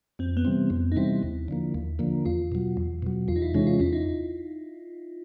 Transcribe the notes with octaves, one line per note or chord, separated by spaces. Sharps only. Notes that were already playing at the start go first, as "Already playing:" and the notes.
F2 C4
B3
C3 E3 G3 C4
F2
D#4
C3 E3 G3 C4 E4
D#2
D3 F3 A#3
D#2
D3 F3 A#3
E2 F4
B2 F#3
E2
B2 F#3
E2 F4
D#4
E4
C3 E3 G#3 C#4 D#4
F4
E2 E4
D#4